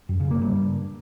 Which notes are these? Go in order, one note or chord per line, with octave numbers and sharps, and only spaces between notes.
F#2
C#3
A#3
G2